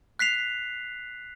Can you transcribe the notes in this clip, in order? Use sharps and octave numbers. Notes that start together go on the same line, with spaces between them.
F#6 B6 C7 F7